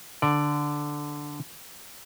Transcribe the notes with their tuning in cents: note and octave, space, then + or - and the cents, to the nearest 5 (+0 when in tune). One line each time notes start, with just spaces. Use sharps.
D3 +0 D5 +0